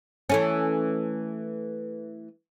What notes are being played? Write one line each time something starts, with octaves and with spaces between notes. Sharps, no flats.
E3 A3 C#4